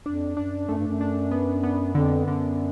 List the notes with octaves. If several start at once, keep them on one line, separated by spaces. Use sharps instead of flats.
F2 D4
F#2 D4
F#2 A3
G2
F#2
D4
B3
B3
F2 D3
F#2 D3